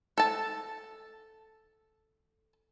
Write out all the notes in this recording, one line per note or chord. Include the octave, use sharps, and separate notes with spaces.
A4 A5